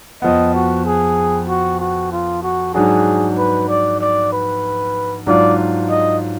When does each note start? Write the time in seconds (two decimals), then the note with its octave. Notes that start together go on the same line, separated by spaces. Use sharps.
0.22 F2 F3 B3 D#5
0.54 F#4
0.85 G#4
1.48 F#4
1.80 F#4
2.12 F4
2.43 F#4
2.74 G#2 F#3 D4 F#4 G#4
3.38 B4
3.68 D5
4.00 D5
4.33 B4
5.27 G#2 F#3 D4 F4 D5
5.89 D#5